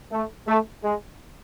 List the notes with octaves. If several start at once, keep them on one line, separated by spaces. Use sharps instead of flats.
A3
A3
G#3